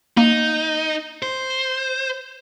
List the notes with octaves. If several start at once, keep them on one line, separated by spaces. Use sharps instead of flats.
A#3 D#4
C5